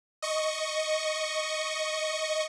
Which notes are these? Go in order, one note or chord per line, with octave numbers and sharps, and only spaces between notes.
D#5 C#6